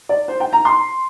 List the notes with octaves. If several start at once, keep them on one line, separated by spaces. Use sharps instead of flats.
D5
C5
G5
A#5
C6